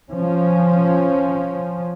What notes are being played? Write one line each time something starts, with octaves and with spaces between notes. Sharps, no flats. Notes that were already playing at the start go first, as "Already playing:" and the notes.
F3 C#4